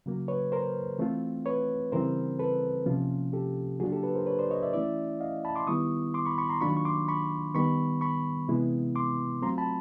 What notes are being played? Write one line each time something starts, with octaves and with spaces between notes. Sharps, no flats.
C#3 F#3 A#3
B4 C#5
A#4 C5
E3 A3 C4 F4
B4 C#5
C#3 E3 G3 C4 A#4 C5
A4 B4
C3 F3 A#3 C#4 F4
G4 A4
C#3 F#3 A#3 D4 F4 F#4 G#4
G4 A4
A4 B4
A#4 C5
B4 C#5
C5 D5
C#5 D#5
D5 E5
E3 A3 C#4 E4 D5 E5
D#5 F5
A5 B5
C6 D6
D#3 G3 B3 E4 C#6 D#6
C6 D6
B5 C#6
B5 C#6
A#5 C6
D#3 F#3 A#3 D4 F4 B5 C#6
C#6
C6 D6
B5 C#6
D#3 G3 B3 B5 C#6
B5 C#6
C3 E3 G#3 B3 E4
C6 D6
F#3 A3 C4 F4 A#5 C6
A5 B5